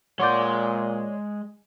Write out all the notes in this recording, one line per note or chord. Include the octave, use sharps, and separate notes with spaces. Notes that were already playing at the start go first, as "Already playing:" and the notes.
A#2 G#3 C#5 D5 F#5 C6 D6 G6